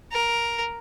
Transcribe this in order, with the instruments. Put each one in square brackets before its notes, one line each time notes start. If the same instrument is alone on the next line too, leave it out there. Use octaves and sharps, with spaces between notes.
[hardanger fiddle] A#4